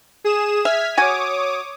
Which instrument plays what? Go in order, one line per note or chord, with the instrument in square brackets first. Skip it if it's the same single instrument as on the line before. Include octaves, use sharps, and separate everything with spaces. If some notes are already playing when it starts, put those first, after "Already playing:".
[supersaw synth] G#4 D#6 E7
[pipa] E5 [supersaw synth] F6 G#6 B6
[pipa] F#4 G#5 [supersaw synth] C#5 D6 D#6